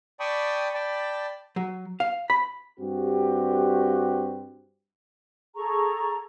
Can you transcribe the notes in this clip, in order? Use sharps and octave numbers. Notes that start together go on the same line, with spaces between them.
D5 G5 A5 B5 C#6 D#6
D5 G5 A5 B5
F#3
F5
B5
G2 C4 F#4 G4
G#4 A4 A#5 C#6